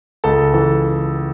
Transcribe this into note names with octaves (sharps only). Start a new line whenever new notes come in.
C#2 A4
E3 A4